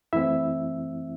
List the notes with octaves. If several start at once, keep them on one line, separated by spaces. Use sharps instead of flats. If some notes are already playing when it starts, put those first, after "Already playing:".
F#2 E3 A3 C4 E4 E5